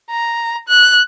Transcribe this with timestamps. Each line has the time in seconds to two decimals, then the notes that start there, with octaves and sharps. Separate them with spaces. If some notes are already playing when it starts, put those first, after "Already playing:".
0.11 A#5
0.68 F#6